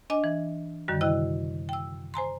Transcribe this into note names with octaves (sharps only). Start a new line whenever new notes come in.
D4 D#5 G#5 D6
E3
F#2 D3 D#3 G3 F#4
C3 E4 D#5 G5 E6 F#6
G5 E6
C5 G#5 A#5 C6